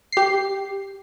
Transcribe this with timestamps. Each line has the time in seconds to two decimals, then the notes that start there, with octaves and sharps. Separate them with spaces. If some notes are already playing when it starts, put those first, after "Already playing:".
0.12 G4 C7